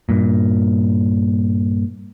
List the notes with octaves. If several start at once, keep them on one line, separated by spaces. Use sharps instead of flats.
G2 A#2